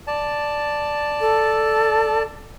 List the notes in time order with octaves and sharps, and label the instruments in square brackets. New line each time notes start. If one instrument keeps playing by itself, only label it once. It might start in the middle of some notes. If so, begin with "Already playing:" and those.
[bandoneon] D5 A5
[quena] A4